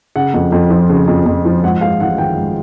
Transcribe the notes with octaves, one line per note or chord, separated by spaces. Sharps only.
C#3 F#5
F2
F2
F3
C#3
F2
F2
F3
G#2 F#5
G#3 F5
A1 F#5
D#3 G5
G#2